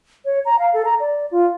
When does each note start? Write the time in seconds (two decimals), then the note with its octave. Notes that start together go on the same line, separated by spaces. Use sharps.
0.25 C#5
0.45 A#5
0.59 F5
0.74 A4
0.85 A#5
1.00 D5
1.31 F4